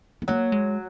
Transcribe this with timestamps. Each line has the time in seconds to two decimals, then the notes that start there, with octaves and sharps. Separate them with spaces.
0.22 B3
0.28 F#3 A#3
0.52 G#3